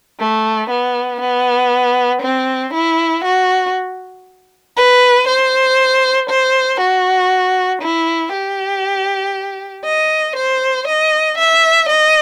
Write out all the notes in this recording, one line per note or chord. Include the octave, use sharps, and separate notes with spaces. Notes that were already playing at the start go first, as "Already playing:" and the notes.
A3
B3
B3
C4
E4
F#4
B4
C5
C5
F#4
E4
G4
D#5
C5
D#5
E5
D#5